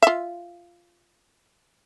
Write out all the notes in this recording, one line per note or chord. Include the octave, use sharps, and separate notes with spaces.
F4 E5